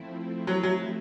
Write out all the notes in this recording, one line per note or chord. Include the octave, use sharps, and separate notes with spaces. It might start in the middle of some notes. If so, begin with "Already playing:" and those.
Already playing: F3 A3 C4 E4
F#3
F#3